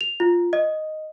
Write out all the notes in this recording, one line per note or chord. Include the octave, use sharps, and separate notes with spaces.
F7
F4
D#5